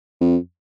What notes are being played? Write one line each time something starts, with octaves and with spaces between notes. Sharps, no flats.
F2